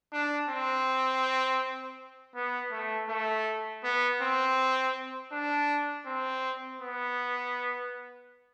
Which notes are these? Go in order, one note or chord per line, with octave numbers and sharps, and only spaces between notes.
D4
C4
B3
A3
A3
B3
C4
D4
C4
B3